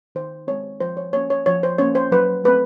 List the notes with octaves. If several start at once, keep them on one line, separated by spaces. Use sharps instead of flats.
D#3 C5
G#3 C4 C#5
F3 C5
C#5
A#3 C#4 C#5
C#5
F3 C#5
C5
A#3 C#4 C#5
C5
F#3 B4
A3 C4 B4